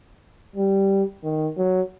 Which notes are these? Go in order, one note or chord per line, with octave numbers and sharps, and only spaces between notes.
G3
D#3
F#3